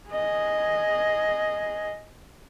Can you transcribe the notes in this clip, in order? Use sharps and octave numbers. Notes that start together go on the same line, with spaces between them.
G#4 D#5